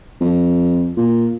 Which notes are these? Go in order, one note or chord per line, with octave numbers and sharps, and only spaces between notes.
F2
A#2